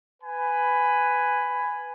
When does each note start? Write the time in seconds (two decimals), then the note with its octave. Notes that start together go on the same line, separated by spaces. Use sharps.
0.21 B4 G#5 B5